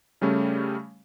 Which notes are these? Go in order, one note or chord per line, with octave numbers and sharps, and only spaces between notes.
C#3 G3 A3 C#4